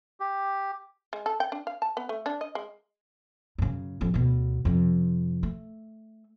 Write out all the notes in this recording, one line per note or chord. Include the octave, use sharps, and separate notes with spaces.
G4
G#3
A4
G5
D4
F5
A5
B3
A3
D4
D#5
G#3
F#2 C#3
A1 F2
D2 B2
F2 C3
A3